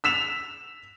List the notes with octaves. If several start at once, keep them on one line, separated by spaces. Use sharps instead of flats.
E6 B6 E7 F7